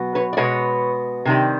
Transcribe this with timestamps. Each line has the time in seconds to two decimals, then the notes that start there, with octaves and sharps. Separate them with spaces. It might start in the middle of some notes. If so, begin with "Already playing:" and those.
Already playing: B2 F#3 B3
0.15 B4 C#5
0.33 D5
0.37 B2 G#3 B3 B4 C#5
1.25 C3 D#3 G3